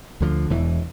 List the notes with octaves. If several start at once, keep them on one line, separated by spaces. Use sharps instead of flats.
D2 D3 F3
E1 E2 E3